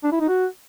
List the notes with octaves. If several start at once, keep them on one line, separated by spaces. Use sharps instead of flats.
D4
E4
D#4
F#4